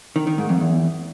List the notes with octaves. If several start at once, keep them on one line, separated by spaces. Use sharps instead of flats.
D#3
D#3
G#2
F2
E2